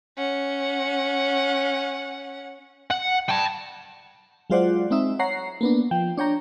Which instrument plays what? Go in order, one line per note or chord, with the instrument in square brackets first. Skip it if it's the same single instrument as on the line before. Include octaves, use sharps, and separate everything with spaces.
[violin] C#4 F#5
[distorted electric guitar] F#5
G5 A5
[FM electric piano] F#3 G#3 F4 C5 D5 F#5
G#3 C4 D#4 E5
C#5 F#5 A#5 C7
A#3 B3 D4
F3 G5
D4 C#5 G5 A#5